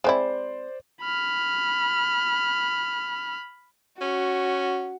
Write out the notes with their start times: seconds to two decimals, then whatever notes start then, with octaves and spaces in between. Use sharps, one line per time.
0.04 G#3 C4 E4 C5 D5
1.01 B5 F6
4.01 C#4 F#4